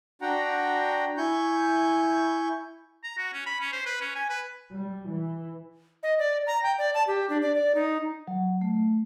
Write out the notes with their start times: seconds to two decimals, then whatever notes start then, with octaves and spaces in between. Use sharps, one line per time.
0.22 D4 F#4 F#5 G5 A#5
1.17 E4 G#5 C#6 G6
3.03 A#5
3.18 F#4
3.33 C#4
3.46 B5
3.61 C#4
3.73 C5
3.86 B4
4.01 C#4
4.15 G#5
4.30 B4
4.72 G3
5.10 E3
6.03 D#5
6.19 D5
6.47 A#5
6.63 G5
6.78 D5
6.94 A5
7.07 G4
7.30 D4
7.42 D5
7.55 D5
7.75 D#4
8.28 F#3
8.61 A3